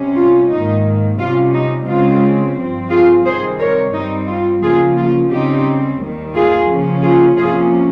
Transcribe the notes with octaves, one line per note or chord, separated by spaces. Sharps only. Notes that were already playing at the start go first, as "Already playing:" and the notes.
Already playing: C3 G3 C#4
F4
G#2 D#3 A#3 D#4
C3 G3 C#4 F4
D#4
C#3 G#3 C4 F4
G2 F3 C4
F4 G#4
C3 D#3 G3 C4 G#4 C5
A#4 C#5
G2 G3 C4 D#4
F4
C#3 F3 A#3 F4 G#4
F4
C#3 G3 C4 D#4 G4
D#2 D#3 G3
F4 G#4
C#3 F3 A#3 C#4
F4 G#4
C3 F3 A#3 C#4 F4 G#4